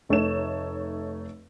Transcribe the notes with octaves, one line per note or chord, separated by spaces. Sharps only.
F1 A3 D#4 C#5 E7